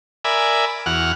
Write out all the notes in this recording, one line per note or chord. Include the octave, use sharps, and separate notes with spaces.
A#4 D5 E5 G#5 B5
E2 F#4 F#5 F6